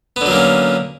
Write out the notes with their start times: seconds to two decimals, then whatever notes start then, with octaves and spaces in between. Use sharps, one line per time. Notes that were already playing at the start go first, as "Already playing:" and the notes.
0.16 B3
0.21 D3
0.26 F#3
0.31 A#3
0.36 C#4